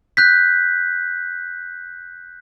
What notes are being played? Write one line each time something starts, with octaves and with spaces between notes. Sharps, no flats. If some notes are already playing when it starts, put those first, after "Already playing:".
F#6 G6 B6